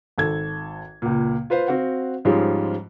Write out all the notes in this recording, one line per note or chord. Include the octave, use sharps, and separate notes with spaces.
G#1 A4 G#6
C#2 A#2
F4 B4 C5 F5
C4 F#4 F5 F#5
G#2 F3 G3 G#3 C#4 F4